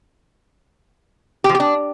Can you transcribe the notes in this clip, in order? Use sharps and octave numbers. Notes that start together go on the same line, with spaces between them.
G4
F3
G4
D4